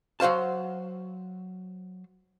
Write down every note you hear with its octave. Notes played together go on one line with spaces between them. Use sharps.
F#3 F#4 C5 F5 A5